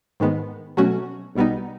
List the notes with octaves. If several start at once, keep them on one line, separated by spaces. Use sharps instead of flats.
G#2 D#3 G#3 B3
B2 F#3 A3 C#4 F#4
B1 B2 G3 B3 D#4